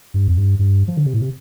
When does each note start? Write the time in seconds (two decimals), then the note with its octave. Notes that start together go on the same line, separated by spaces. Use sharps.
0.14 G2
0.28 F2
0.37 G2
0.59 G2
0.88 F3
0.97 D3
1.06 C3
1.13 A2
1.21 C3